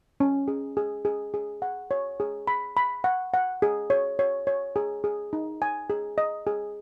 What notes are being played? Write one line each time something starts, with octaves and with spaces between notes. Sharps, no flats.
C#4
G#4
G#4
G#4
G#4
F#5
C#5
G#4
B5
B5
F#5
F#5
G#4
C#5
C#5
C#5
G#4
G#4
D#4
G#5
G#4
D#5
G#4